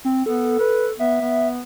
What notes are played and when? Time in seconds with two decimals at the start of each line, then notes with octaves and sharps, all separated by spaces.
0.05 C4
0.26 B3 A4
0.60 B4
0.99 B3 E5
1.21 B3